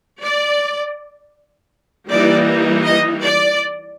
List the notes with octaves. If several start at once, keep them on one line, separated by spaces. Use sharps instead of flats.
D5
E3 G3 A#3 D#4 D5
D#5
D5